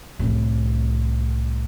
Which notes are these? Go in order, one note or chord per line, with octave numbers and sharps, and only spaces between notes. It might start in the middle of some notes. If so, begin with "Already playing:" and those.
C2 A2